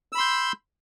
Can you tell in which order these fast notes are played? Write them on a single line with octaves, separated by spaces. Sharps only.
E6 B5 C6 G6